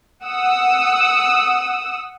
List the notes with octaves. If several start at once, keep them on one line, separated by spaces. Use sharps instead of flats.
F#5 D#6 E6